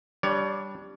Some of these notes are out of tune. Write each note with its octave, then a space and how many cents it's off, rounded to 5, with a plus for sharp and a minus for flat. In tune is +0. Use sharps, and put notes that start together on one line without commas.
G3 +0 D4 +0 C#5 +25